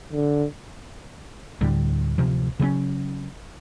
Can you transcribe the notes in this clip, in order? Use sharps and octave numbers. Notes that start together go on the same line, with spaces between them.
D3
D2 A2 D3 G3
D1 C3 F3
C#3 F#3 G#3 C#4